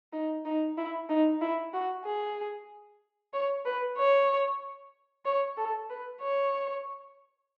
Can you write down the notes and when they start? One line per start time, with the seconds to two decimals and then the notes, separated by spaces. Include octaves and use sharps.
0.13 D#4
0.45 D#4
0.78 E4
1.09 D#4
1.42 E4
1.74 F#4
2.05 G#4
3.33 C#5
3.66 B4
3.98 C#5
5.25 C#5
5.57 A4
5.90 B4
6.21 C#5